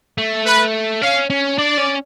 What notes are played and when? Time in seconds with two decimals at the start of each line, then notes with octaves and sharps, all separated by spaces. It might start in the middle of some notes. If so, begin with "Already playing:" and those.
0.18 A3
0.46 B4
1.02 C#4 F5
1.30 C#4
1.58 D4 D5
1.78 C#4